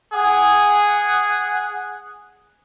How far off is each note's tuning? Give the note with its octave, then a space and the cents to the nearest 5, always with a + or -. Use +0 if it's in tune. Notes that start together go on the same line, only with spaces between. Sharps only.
G#4 -5 F#5 +0